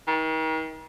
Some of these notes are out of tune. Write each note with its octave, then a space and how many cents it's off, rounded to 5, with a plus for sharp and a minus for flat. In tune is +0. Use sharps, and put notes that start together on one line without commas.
D#3 +40